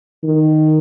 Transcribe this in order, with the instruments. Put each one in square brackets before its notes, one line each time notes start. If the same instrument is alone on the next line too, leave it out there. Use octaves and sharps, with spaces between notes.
[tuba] D#3